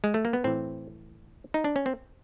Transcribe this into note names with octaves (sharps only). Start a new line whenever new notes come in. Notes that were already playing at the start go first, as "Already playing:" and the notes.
G#3
A3
A#3
B3
A2 E3 C4
D#4
D4
C#4
C4